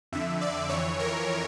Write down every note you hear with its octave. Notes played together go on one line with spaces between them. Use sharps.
F2 D3 E5
D5
F2 E3 C#5
A#4